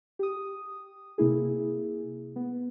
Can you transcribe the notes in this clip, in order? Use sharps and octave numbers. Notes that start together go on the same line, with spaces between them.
G4 D#6
C3 A#3 E4 G#4
B3